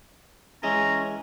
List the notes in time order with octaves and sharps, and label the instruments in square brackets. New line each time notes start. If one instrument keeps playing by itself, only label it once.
[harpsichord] E3 G#3 [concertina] C#4 [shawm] A#5